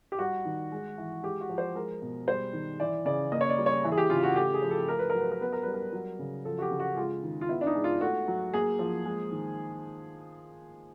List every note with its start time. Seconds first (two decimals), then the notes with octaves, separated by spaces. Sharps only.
0.12 G4
0.19 G3 F#4
0.45 D#3
0.72 G#3
0.98 E3
1.23 G#3 G4
1.41 F#4
1.49 F3
1.58 C5
1.75 G#3 A#4
2.02 B2
2.27 G3 C5
2.53 D#3
2.80 E3 D5
3.05 C#3 D5
3.32 A#3 D#5
3.41 C#5
3.50 D5
3.58 G3
3.66 C#5
3.84 E3
3.92 G#4
3.98 G4
4.10 C#3 F4
4.23 F#4
4.36 A3 G4
4.54 G#4
4.62 F3
4.71 A4
4.88 A3 A#4
4.99 B4
5.10 F#3 A#4
5.20 B4
5.31 A#4
5.41 B3 B4
5.52 A#4
5.63 G3 B4
5.74 A#4
5.93 F#3
6.19 C#3
6.45 F3 A4
6.58 F#4
6.62 G4
6.71 C#3
6.80 F#4
6.97 G#3 F4
7.23 D#3
7.41 F4
7.49 B3 E4
7.61 D4
7.67 D#4
7.75 G#3
7.84 F4
8.01 A3 F#4
8.28 F#3
8.54 A#3 G#4
8.79 F3
9.06 G#3
9.31 D#3